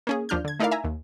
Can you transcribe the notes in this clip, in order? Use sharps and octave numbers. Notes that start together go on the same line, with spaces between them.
A#3 C#4 G#4
D#2 F3 D4 F6 G6
D3 G#6
A3 D#4 E4 A#4 D5 F5
E5 G#5 A#5
D#2